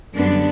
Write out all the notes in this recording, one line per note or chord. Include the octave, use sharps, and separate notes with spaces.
F#2 D3 G3 B3 D4